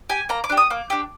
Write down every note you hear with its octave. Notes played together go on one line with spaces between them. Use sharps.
G4 G#5
A#3 A#5
D6
D4 G4
D#6
A#3 D6
D4 G4